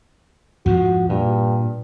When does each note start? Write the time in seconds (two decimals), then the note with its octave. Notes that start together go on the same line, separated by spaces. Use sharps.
0.66 F2 G#2 F3 F#4
1.09 G2 A#2